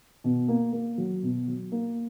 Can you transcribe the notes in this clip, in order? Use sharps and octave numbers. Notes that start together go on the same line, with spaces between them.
B2
A#3
A#3
F#3
B2
F#3
A#3